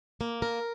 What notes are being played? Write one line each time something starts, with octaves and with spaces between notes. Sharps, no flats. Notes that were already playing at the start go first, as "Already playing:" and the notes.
A#3
A#4